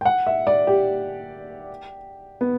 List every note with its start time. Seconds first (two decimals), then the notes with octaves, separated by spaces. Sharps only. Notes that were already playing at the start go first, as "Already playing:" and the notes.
0.01 G5
0.05 F#5
0.27 E5
0.47 D5
0.67 G4
2.41 B3